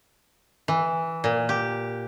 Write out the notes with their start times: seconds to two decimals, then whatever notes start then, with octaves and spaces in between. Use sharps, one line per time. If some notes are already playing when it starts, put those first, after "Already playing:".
0.68 E3
1.24 A#2
1.49 G4